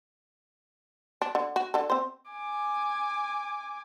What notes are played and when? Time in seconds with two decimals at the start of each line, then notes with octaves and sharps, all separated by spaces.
1.22 D4
1.35 D3
1.56 F#4
1.74 D3 A4
1.90 C4 C5
2.31 G#5 D6